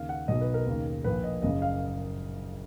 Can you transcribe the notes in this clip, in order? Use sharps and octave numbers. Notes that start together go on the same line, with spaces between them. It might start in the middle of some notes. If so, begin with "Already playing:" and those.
Already playing: D#2 C#3 F5
F#5
B1 B2 D#5
B4
A#4
D#2 C#3
A#1 A#2 B4
D#5
F#1 F#2 C#3 D#5
F5